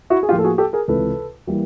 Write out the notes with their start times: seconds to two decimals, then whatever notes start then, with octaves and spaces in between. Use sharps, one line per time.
0.10 E4 F#4
0.23 G#4
0.29 A2 F4 G4
0.32 F3 A#3
0.39 A4
0.44 F#4 G#4
0.58 G4 A4
0.73 G#4 A#4
0.88 C#2 C3 E3 A4 B4
1.47 E3 G3 A#3